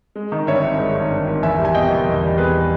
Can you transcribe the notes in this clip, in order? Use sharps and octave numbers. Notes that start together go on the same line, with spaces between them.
G#3
D#3
G2 C#5 E5
G#1
G#3
D#3
G2
G#1
E2 E5 G#5
G3
G#5
B2 D#5 G5
E2
E2
G3
B2 G#4 B4